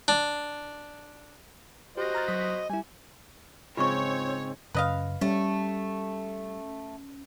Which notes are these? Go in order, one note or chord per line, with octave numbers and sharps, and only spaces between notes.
D4
F#4 G4 C5 D#5 A#6
A#5 F6 A6
F#3 D#6 B6
G3 E4 G#5
G#2 C#3 C4 F4 C#5 C#6
F#2 C#3 B4 D#5 F5
G3 A3 C#4